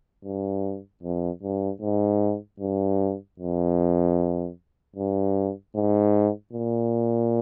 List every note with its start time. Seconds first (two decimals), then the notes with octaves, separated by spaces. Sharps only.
0.24 G2
1.03 F2
1.43 G2
1.81 G#2
2.60 G2
3.40 F2
4.96 G2
5.75 G#2
6.53 A#2